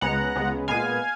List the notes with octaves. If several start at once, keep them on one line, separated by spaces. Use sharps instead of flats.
C#2 C#3 G#3 B3 F#5 A#5
C#2 C#3 G#3 B3
A#2 G#3 B3 F5 G#5